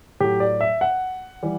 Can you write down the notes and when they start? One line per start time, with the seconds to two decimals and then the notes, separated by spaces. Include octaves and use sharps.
0.20 A2 F#3 G4
0.40 D5
0.61 E5
0.81 F#5
1.43 E3 G3